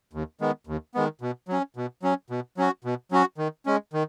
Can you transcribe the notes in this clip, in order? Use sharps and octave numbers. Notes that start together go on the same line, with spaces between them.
D#2
D#3 G#3 B3
D#2
D#3 G#3 B3
B2
F#3 C#4
B2
F#3 C#4
B2
F#3 C#4 F#4
B2
F#3 C#4 F#4
D#3
G#3 C#4
D#3